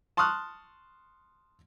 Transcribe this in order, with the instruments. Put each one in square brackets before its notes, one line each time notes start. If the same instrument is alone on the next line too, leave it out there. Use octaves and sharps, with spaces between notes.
[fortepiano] A5 C6 C#6 D#6 F6 F#6